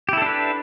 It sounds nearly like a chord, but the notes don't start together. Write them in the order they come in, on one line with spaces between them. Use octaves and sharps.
G4 E4 A4 D4 B4